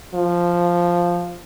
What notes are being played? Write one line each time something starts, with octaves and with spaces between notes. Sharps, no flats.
F3